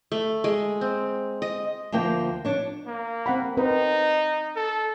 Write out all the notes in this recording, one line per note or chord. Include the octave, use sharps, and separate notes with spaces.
A3
G#3
C4
D#5
D2 F3 A#3 G5
D4 C#5
A#3
C4 F#5 B5
C4 D#4 A#4 B4
A4